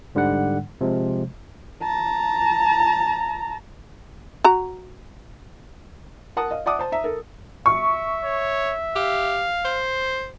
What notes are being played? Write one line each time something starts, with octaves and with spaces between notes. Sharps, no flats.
G#2 D3 G3 D4 F#5
C3 F3 G#3
A5 A#5
F#4 A#5
A#4 F#5 A5 D#6
D#5 F5
D5 E5 F#5 A5 D6 D#6
C5 A5
E5 A#5
A4 A#4
E5 C#6
C#5
G4 F5
C5